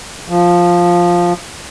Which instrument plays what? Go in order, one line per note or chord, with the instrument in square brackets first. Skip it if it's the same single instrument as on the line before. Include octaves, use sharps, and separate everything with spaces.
[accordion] F3